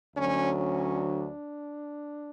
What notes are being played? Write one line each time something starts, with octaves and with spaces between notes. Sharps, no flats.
D2 D3 F#3 C#4
C#4
D4